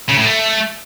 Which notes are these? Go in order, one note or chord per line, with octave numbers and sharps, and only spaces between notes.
C#3
A2
A3